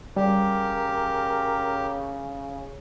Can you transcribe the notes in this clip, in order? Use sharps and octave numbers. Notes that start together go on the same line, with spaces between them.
C#3 G3 G4 A#4